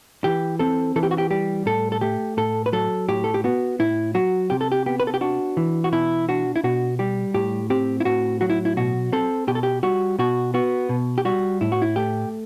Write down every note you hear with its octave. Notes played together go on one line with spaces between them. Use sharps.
E3 G4
C4 A4
E3 A4
G4
F#4
G4
G3 G4
A2 A4
A4
A3 G4
A2 A4
B4
F#3 A4
A2 G4
A4
G4
B3 F#4
A2 E4
F#3 F#4
C3 G4
A4
G4
B3 G4
B4
A4
G4
D4 F#4
E3
F#4
B2 E4
D4 F#4
E4
B2 F#4
G3 G4
A2 G4
C4 G4
E4
A2 F#4
F#3 F#4
E4
E4
B2 F#4
C4 A4
B2 G4
A4
G4
G3 F#4
B2 F#4
B3 F#4
B2
G4
G3 F#4
A2 E4
F#4
E4
A3 G4